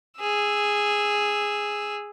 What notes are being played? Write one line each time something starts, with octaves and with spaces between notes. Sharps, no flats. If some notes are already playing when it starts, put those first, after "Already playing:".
G#4 E6